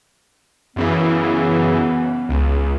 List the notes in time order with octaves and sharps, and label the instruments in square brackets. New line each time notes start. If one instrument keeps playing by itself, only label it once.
[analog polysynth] F#2 C#3 E3 [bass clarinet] B3
[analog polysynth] C#2